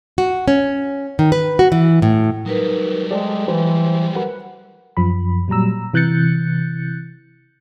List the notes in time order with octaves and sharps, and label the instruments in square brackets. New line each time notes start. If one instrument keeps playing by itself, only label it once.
[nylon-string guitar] F#4
C#4
D#3
B4
F#4
E3
A2
[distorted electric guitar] F#3 G3 [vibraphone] D#4 A#4 B4
[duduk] G#3 [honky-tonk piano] A4 C5 D5 [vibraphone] G5
[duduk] E3 [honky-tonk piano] B4 C5
[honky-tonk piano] A#4 B4 F#5
[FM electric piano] F#2 F3 B5
A#2 F#3 G3 A#5 E6
C3 E3 F#6 G6 A6 C#7